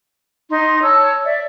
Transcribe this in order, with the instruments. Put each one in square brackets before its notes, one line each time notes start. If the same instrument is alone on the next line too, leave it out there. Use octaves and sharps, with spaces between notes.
[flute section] D#4 C6
C#5 A5 E6
D5 E5